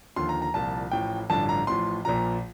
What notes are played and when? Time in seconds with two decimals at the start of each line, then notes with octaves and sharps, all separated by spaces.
0.16 D#2 D3 F3 C6
0.29 A#5
0.42 A#5
0.54 C2 A#2 F3 A5
0.92 A1 A2 F3 G5
1.30 A1 G2 D3 F3 A5
1.49 A#5
1.67 A1 A2 F3 C6
2.05 A#1 A#2 F3 A#5